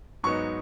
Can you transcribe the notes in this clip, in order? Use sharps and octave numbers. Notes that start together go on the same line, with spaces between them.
G#2 F#3 B3 D#4 C#6